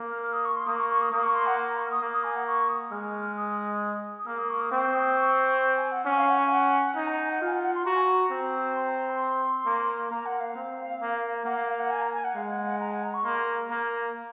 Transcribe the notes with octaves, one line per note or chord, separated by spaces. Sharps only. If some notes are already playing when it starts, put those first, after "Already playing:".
Already playing: A#3
F6
F6
D#6
C#6
C6
A#3 D#6
C#6
C#6
D#6
A#3 D#6
C#6
C6
F#5
A#5
C#6
F6
D#6
A#3
D#6
G#5
F#5
C#6
D#6
G#3 F6
D#6
D#6
A#3 F6
D#6
C#6
D#6
C4 C#6
D#6
C#6
G#5
F#5
C#4 F#5
F5
F#5
G#5
F#5
D#4 G#5
A#5
G#5
F#5
F4
G#5
F#5
F#5
C6
F#4 A#5
G#5
A#5
C4
C6
A#5
A#5
C6
A#3
A#3 A#5
F#5
F5
C4
A#3
A#3 F#5
F5
F5
F#5
G#5
A#5
G#5
F#5
G#3 F5
F#5
F#5
A#5
F#5
A#5
C#6
A#3 C6
A#3